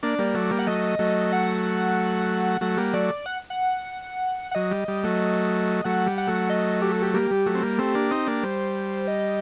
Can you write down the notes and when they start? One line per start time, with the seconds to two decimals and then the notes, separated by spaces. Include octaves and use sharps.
0.03 A#3 D4 D5
0.19 G3 A#3
0.34 F#3 A3
0.51 G3 A#3
0.59 F#5
0.67 F#3 A3 D#5
0.99 F#3 A3
1.32 F#5
2.61 F#3 A3 F#5
2.77 G3 A#3
2.93 F#3 A3 D5
3.26 F#5
3.50 F#5
4.51 F#5
4.55 F#3 D#5
4.71 G3
4.88 G3
5.04 F#3 A3
5.84 F#3 A3 F#5
6.06 G3
6.18 F#5
6.27 F#3 A3
6.49 D#5
6.82 G4
6.92 A4
7.02 G4
7.14 G3 A#3 G4
7.31 G3
7.46 F#3 A3
7.55 C4
7.62 G3 A#3
7.78 A3 C4
7.94 A#3 D4
8.11 C4 D#4
8.27 A#3 D4
8.43 G3 C5
9.08 D#5